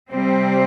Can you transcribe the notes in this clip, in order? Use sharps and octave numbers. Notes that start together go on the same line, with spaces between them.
C3 G3 C4